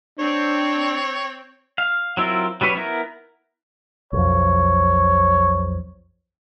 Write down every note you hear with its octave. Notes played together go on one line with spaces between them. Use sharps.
C4 D4 C#5 G5
F5
F#3 C4 E4 F4 A#4
F#3 G3 C#4 B4 C#5
B3 E4 A#4
B1 F2 C#5